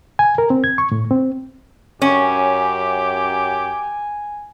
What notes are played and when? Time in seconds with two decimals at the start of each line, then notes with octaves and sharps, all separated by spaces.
0.19 G#5
0.38 A#4
0.50 C4
0.64 G#6
0.78 C#6
0.92 A2
1.11 C4
2.02 F#2 C#4 G4 G#5